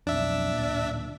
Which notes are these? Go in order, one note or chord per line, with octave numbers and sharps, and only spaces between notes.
B1 F2 D4 E5
D1 A#2